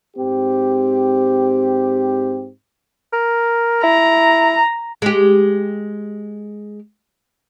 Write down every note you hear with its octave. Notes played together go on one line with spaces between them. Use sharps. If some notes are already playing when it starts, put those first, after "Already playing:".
G#2 C4 G4
A#4
E4 A#5
G#3 G4